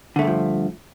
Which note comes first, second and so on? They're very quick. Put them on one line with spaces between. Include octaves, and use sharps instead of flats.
D3 A3 G2 G#3 F3